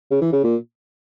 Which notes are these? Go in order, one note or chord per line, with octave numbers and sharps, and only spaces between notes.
C#3
E3
C#3
A#2